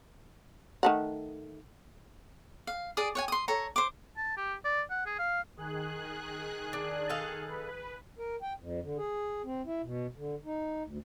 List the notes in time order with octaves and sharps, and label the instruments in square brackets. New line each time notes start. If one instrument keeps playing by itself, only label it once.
[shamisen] D#3 A3 F#5
[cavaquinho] F5
G#4 D5 D#6
C#5 F#5 G#5
C6 D#6
A4 C#5 A#5
C5 D6
[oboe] A5
G4
D5
F#5
G#4
F5
[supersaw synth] D#3 G#4 F#6
[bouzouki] D4
A4 D#5 F5
[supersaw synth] B4
[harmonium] A#4
G5
F2
D3
G#4
C4
E4
B2
D3
D#4
D2